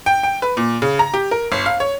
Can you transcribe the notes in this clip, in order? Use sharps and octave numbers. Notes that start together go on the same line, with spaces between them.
G5
G5
B4
A#2
C#3
A#5
G4
A#4
G1
F5
C#5